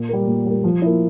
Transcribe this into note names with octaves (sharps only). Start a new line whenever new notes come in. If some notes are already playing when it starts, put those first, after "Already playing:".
Already playing: A#2
G3 A#3
A#2
G3 A#3
F3
A#3 E4